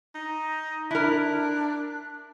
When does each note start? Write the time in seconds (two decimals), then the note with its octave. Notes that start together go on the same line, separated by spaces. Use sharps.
0.15 D#4
0.91 D4 E4 A#4 F#6